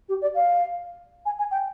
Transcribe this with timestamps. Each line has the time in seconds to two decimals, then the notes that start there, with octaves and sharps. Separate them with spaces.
0.08 G4
0.21 D5
0.34 F5
1.25 G#5
1.38 G#5
1.50 G5